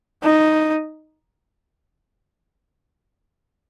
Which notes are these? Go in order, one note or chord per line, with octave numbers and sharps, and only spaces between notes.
D#4